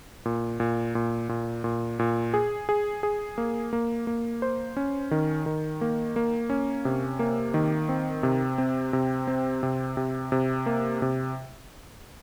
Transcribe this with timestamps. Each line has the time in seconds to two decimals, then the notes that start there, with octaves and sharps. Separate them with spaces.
0.25 A#2
0.60 A#2
0.95 A#2
1.29 A#2
1.64 A#2
1.99 A#2
2.34 G#4
2.69 G#4
3.03 G#4
3.38 A#3
3.73 A#3
4.07 A#3
4.42 C5
4.77 C#4
5.11 D#3
5.46 D#3
5.81 A#3
6.16 A#3
6.50 C#4
6.85 C3
7.19 A#3
7.54 D#3
7.89 C4
8.23 C3
8.58 C4
8.93 C3
9.28 C4
9.63 C3
9.97 C3
10.32 C3
10.66 A#3
11.02 C3